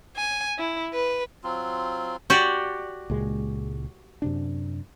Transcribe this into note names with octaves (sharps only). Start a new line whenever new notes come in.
G#5
E4
B4
F#3 C4 F4
F#4 G4 D5
C#2 A#2 G#3
F#2 C3 D4